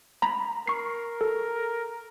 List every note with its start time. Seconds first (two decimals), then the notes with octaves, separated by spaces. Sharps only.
0.22 A#5 B5
0.67 A#4 C#6 C7
1.21 A4